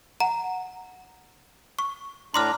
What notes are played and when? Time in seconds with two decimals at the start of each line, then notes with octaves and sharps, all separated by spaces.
0.20 F#5 A#5
1.79 C#6
2.34 A2 D4 A#5 C6 D6 F6